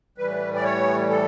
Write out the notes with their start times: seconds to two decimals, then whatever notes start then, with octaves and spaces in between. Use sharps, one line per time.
0.18 A2 E3 G3 B4
0.55 D5
0.64 C#5
1.09 A4